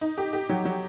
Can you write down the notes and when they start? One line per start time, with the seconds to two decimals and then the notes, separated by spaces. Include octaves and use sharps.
0.01 D#4
0.18 G4
0.33 G4
0.49 F#3
0.65 F#3